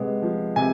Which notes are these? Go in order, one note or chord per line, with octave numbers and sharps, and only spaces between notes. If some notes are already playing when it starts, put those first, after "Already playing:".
Already playing: C3 G#3 B3
F3
C3 G#5